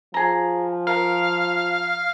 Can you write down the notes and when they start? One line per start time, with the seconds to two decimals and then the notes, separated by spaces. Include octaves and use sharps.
0.14 F3 G#4 A#5
0.87 A#4 F5 F6